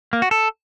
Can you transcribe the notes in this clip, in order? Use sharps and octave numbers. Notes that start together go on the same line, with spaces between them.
A#3
F#4
A4